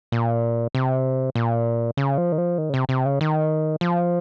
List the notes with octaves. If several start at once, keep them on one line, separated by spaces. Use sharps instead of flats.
A#2
C3
A#2
C#3
F3
D#3
F3
D#3
C#3
C3
C3
C#3
D#3
F3